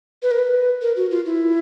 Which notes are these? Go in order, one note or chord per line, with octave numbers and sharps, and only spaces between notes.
B4
A#4
B4
A#4
F#4
F4
E4